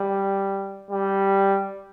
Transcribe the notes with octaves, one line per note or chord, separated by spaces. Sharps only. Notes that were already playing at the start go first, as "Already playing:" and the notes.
Already playing: G3
G3